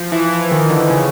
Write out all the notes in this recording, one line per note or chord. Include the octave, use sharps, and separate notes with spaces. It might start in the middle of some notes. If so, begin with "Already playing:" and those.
Already playing: F3
E3
E3
D#3
D3
C#3